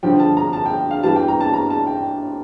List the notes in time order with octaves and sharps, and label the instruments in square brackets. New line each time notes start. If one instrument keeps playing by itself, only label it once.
[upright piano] G2 D3 F3 G5
A5
A#5
A5
G5
F5
G2 E3 G3 A5
G5
A#5
A5
A#5
A5
G5